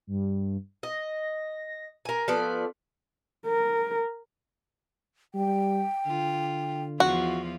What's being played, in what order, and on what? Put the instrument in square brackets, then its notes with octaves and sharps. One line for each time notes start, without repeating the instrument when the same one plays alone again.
[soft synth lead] G2
[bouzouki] D#5 [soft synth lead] A#6
[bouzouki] A#4 G#5
[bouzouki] F3 B3 D5 [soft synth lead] A4
[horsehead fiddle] A#4
[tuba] G3 [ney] G5
[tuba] D3 [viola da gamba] F4
[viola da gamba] E2 F3 F4 [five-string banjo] F#4